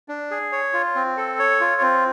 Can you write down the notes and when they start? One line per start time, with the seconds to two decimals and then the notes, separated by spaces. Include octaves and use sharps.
0.09 D4
0.31 G#4
0.52 C#5
0.73 F4
0.95 C4
1.17 A4
1.39 C#5
1.60 F4
1.81 C4